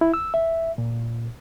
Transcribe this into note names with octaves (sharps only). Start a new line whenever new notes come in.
E4
E6
E5
A#2